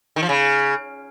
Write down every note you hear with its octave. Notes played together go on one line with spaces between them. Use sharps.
D#3
F3
C#3